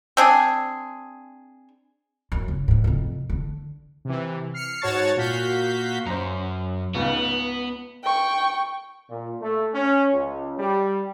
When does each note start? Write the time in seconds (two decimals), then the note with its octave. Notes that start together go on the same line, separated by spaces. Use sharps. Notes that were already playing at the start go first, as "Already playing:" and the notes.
0.17 C4 D4 G#4
2.32 F#2
2.48 C#3
2.68 F2 G#2
2.84 F2 C3
3.30 D3
4.05 C3 E3
4.54 F6 C7 C#7
4.81 G#2 F#4 C#5 A5 C#6 A6
5.17 A#2 F#4 F5 G6 B6
6.06 F#2 C5 A#5
6.95 C#2 G#2 C#3 B3
8.03 G5 C#6
9.09 A#2
9.41 A3
9.73 C#4
10.12 C#2
10.58 G3